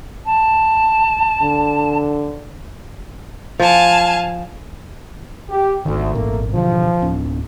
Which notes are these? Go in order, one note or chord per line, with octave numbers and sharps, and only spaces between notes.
A5
D3
F3 F5 G#5 A5
G4
G#1 D2 D#3
G#1 A#2 A3 A#3
B2 D3 E3 F3
D1 C#4